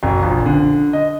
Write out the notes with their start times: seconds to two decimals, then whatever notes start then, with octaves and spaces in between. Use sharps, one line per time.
0.03 F#1
0.22 A#1
0.46 D3
0.93 D#5